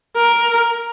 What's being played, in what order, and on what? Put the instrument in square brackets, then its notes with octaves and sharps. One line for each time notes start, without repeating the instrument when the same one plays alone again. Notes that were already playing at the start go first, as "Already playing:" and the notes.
[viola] A#4